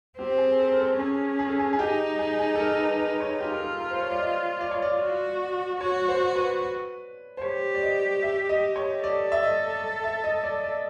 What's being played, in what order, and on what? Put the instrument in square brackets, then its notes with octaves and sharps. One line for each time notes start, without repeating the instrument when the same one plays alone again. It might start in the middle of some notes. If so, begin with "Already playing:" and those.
[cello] C4 [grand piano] G4
[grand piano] G#4
A4
A#4
A4
[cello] C#4 [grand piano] G#4
[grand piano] G#4
A4
G#4
G#4
[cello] D#4 [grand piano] G4
[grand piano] G#4
G#4
A4
A#4
B4
B4
C#5
[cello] F4 [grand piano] G4
[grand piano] A#4
A4
A#4
C5
C#5
D5
D#5
D5
C#5
D5
[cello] F#4
[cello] F#4 [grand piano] C#5
[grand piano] C5
B4
C5
[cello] G4 [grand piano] C#5
[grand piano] D5
D#5
E5
D#5
C#5
[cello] A4 [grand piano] D5
[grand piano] E5
D#5
E5
D#5
D5
D5